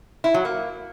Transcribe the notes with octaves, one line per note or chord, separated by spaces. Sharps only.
E4
F#3
A#3